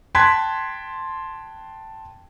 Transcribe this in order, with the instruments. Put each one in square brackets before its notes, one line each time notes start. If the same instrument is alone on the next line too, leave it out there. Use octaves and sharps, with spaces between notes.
[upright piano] G5 A5 C6 F#6 G#6 B6